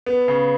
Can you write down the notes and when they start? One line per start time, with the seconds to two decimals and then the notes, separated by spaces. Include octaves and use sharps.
0.06 B3
0.28 C#3